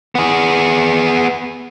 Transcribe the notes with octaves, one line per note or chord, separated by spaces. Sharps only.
B3 G#4